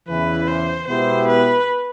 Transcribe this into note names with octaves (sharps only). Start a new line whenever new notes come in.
E2 C#3 E3 B4
C5
B2 G#3 B3 E4 G4 C5
B4